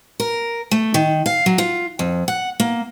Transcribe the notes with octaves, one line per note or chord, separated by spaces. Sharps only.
A#4
A3
D#3
F5
F#3
F4
F2
F#5
A#3